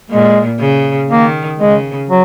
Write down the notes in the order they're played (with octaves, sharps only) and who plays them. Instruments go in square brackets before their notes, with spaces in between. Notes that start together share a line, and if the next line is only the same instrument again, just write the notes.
[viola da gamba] A#2 [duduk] G#3
[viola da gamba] C#3
[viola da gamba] D#3 [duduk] A#3
[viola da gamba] C#3 [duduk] G#3
[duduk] F#3